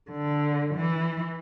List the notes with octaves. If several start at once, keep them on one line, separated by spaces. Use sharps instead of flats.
D3
E3